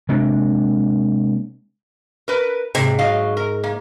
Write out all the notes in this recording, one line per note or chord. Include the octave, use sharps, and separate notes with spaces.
C3 G#3 A#3 D4
A#4 B4
G#2 C3
F#3 D#5 F5
A#4
A#3